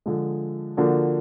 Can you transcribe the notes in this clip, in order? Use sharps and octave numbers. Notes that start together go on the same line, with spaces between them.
D3 F3 G#3
D3 F3 A#3 D4 F#4